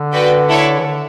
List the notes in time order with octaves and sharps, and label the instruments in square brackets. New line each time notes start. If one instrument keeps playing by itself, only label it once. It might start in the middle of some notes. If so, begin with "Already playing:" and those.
Already playing: [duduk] D3
[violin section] F#4 B4 D5 G5
A3 E4 A4 C#5
[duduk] E3
D3